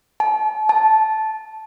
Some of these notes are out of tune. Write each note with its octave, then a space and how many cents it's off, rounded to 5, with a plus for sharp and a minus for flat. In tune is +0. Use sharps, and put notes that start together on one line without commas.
A5 -35
A5 -10